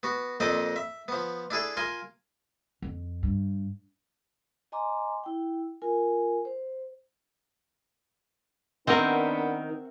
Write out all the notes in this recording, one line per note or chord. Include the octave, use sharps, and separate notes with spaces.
B3 F#4
F2 A#2 C4 D4 D5 D#5
E5
F3 B3
D4 E4 G#4 A4
F4 A#4 G#5 C6
F2
G2
D#5 G#5 A#5 C6 D6
E4 G5
F4 A#4 G#5
C5
D#3 B3 C4 D4 F#4 A#4 E5